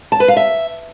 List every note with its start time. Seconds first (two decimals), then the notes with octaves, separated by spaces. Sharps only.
0.12 A5
0.20 B4
0.28 F5
0.37 E5